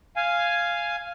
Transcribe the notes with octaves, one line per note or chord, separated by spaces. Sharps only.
F5 G#5